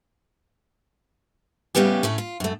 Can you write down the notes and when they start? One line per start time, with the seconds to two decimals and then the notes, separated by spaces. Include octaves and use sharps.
1.75 A2 C#3 G3 B3 C#4 G4
2.03 A2 A3 C#4
2.18 F4
2.40 F#2 A3